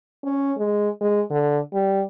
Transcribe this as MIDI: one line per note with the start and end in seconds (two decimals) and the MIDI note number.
0.24 0.53 61
0.58 0.89 56
1.01 1.21 56
1.30 1.59 50
1.73 2.04 55